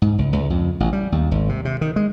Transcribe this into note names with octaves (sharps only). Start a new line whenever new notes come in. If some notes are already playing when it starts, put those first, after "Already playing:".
G#2
C#2
C#2
F2
A1
G3
D#2
G#1
C3
C3
D#3
G#3